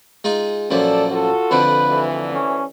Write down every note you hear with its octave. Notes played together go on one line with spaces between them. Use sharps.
G#3 D#4 F4
F#2 A#2 F3 A4 D5
F4 F#4 A4
F2 D3 F3 B4
D2 E3
C#4